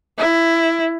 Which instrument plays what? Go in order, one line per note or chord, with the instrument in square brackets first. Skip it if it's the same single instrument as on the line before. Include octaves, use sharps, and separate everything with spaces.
[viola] E4